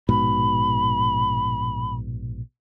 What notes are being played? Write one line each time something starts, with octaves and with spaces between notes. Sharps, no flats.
A#1 G#2 B2 B5